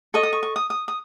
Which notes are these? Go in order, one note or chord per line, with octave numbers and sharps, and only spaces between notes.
A4 D#5 C#6
D#6
C#6
C#6
D#6
D#6
D#6